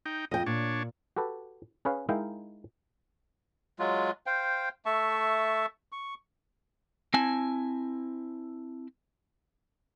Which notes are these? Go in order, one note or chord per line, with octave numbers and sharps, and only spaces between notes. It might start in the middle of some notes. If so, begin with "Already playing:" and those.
D#4 G5
F2 D#5 G5
A#2 D4 C#5
F#4 G4 A4 B4
C#4 G#4 B4 C#5 F5
G#3 D#4 E4 A#4 F5 G5
F#3 G#3 F4
C5 F5 G5
A3 E5 A5 C#6
C#6
C4 E4 G#5 A5